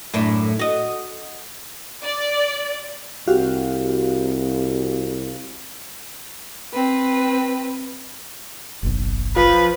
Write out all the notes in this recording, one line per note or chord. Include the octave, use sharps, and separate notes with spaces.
F#2 A2 D4
F#4 D#5
D5
C2 F#4 G4 F5
C4 B4
F#1 B1
F3 B4